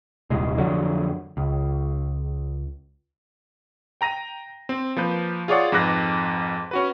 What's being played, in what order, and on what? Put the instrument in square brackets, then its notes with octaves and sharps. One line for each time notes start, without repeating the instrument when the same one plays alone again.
[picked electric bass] D#1 C2 G#3
F2 D3 F#3
C#2
[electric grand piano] G5 A#5 A#6 D#7
C4
F3 A#3 B4 G6
F4 G#4 C#5 D5 F#5
F2 G#2 B4 D6 F#6 A#6
C#4 F#4 B4